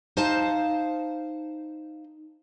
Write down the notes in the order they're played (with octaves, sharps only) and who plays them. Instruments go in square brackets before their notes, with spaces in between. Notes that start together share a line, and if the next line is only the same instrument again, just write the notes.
[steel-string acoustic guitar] D#4 C5 F5 A5